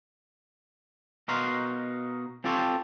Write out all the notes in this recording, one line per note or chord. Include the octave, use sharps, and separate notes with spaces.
B2 D#4 F#4 A#4 F5 C6
C4 F4 G4 A4 C5 C#5